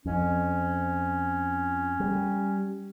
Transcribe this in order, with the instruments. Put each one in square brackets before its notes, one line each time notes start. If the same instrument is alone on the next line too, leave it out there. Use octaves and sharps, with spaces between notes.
[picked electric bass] F2 [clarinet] C#4
[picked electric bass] G3